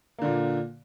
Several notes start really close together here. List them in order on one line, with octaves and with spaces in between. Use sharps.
A#3 D3 A#2